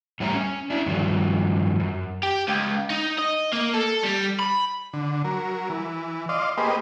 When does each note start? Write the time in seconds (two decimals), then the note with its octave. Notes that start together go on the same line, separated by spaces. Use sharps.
0.20 A2 G3 C#5 E5 G#5 A#5
0.34 C#4
0.70 D4 E4
0.86 G2 D#3 F3 F#3
1.80 F#2
2.23 G4
2.48 C#2
2.90 D#4
3.18 D#5
3.52 A#3
3.74 A4
4.04 G3
4.39 B5
4.93 D3
5.25 F#3 A#4
5.70 E3
6.29 D5 D#5 F5 C6
6.58 A#3 G4 G#4 B4 C5 D#5